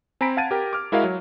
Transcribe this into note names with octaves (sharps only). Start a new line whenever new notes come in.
C4 G#5 A#5 B5 B6 D7
F5 F#5 A5 G#6 A6 D#7
G4 A#4 G5
D6 F6
G#3 E4 F#4 A#4 D#5 F5
F#3